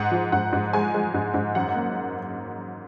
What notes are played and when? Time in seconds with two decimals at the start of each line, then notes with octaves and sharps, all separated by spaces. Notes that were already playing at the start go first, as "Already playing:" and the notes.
Already playing: G#2 F#5
0.12 F3
0.32 G#2 F#5
0.53 G#2
0.73 G#3 G#5
0.94 G#3
1.14 G#2
1.34 G#2
1.55 F#2 F#5
1.75 A#3